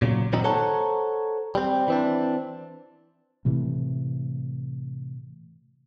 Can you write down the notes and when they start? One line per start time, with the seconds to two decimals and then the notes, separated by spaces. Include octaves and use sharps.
0.02 A#2 C#3 E3 F#3
0.33 A#2 D#3 F#3 C4 D#4
0.44 A4 C5 C#5 F#5 A5 A#5
1.55 G3 C4
1.88 E3 C4 D4
3.45 A2 C3 E3 A3